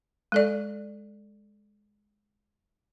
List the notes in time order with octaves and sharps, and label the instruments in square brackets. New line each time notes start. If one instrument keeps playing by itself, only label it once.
[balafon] G#3 A4 D5